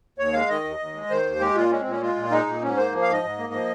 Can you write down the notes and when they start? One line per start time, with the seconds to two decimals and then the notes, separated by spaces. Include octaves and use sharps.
0.18 D#2 C#5
0.33 G#3 F5
0.48 D#3 D#5
0.64 D#2
0.79 D#2
0.94 G#3
1.10 D#3 C5
1.25 D#2
1.40 G#3 G4
1.55 A#2 F4
1.71 G#3 C#4
1.81 A#2 C4
1.91 C#4
2.01 G#3 F4
2.16 A#2
2.31 G#3 D#4
2.47 A#2
2.61 G#2 C#4
2.77 A#3 C5
2.92 F3
3.02 F5
3.08 G#2 D#5
3.23 G#2
3.38 A#3
3.53 F3